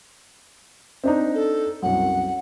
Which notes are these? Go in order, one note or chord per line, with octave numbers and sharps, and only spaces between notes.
C4 D4 D#4
A4
C2 F#2 F#5